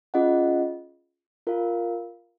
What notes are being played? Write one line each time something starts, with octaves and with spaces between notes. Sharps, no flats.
C#4 F4 G#4 D#5 F#5
F4 A#4 F5